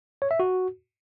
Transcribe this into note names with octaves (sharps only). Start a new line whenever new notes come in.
C#5
E5
F#4